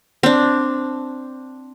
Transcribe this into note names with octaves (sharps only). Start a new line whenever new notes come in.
C4 D4